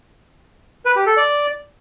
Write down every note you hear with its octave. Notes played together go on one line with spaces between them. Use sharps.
B4
G4
A4
D5